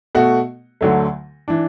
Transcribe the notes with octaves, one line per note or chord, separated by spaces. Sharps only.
B2 A3 F#4
D2 D3 F#3 A3
E3 D4